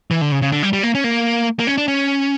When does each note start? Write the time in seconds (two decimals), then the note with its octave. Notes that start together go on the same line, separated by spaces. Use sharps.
0.11 E3
0.21 D3
0.32 C#3
0.42 C#3
0.52 D3
0.63 G3
0.73 G3
0.83 A#3
0.95 C#4
1.04 A#3
1.59 A#3
1.67 C#4
1.77 D4
1.88 C#4